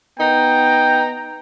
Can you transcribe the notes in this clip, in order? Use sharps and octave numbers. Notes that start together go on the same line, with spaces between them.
B3 D#4 G5 A#5